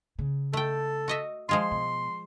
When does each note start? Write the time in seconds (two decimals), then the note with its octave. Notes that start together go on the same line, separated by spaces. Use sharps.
0.19 C#3
0.53 A3 A4 G5
1.08 F#4 D#5 E5
1.49 F3 G#3 F4 C6
1.71 B2